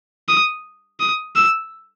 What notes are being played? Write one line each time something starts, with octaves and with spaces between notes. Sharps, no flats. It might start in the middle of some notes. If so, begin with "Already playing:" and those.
D#6
D#6
E6